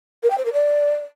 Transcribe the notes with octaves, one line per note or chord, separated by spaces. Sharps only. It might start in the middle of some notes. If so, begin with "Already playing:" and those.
A#4
G5
C5
A#4
D5